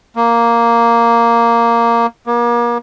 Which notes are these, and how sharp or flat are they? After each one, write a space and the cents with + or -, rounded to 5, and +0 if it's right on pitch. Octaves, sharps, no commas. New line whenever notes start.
A#3 +0
A#3 +35